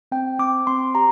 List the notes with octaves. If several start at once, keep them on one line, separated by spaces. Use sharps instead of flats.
C4 G5
C4 D6
C4 C6
G4 A#5